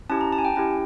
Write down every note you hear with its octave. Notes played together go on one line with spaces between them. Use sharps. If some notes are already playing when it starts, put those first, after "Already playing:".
C#4 E4 G4 A5
A#5
A5
G#5
G5
C#4 E4 G4 G5